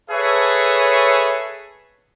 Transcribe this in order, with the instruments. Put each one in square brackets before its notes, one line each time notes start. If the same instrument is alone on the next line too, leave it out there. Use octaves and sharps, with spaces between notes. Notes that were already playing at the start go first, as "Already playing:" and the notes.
[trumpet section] G#4 A4 B4 C#5 E5